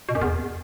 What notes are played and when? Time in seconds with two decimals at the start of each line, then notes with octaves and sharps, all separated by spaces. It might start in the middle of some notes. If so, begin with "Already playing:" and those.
0.09 B2
0.15 F#2
0.21 E2